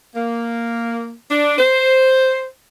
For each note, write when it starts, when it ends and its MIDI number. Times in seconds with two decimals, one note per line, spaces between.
0.15 1.13 58
1.31 1.55 62
1.58 2.46 72